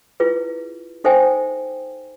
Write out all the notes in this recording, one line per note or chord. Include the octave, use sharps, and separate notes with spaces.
E4 F4 G#4 B4
D#4 A4 C5 E5 G5 G#5